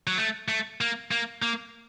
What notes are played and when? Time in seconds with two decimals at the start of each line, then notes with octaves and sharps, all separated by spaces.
0.07 F#3
0.17 A3
0.48 A3
0.81 A#3
1.11 A#3
1.42 A#3